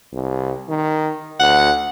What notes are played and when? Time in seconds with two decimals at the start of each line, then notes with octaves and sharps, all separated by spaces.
0.13 C2
0.69 D#3
1.40 D2 F#5